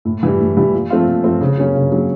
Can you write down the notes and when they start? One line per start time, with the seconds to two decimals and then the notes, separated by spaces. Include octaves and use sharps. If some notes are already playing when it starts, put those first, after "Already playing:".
0.05 A2
0.23 E3 G3
0.40 A2
0.57 E3 G3
0.73 A#2
0.90 F3 A3 C4 F4
1.07 A#2
1.24 F3 A3 C4 F4
1.41 C#3
1.58 F#3 A#3 C#4
1.75 C#3
1.92 F#3 A#3 C#4